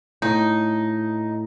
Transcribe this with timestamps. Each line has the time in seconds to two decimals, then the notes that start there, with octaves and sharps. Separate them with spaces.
0.22 A2 D#4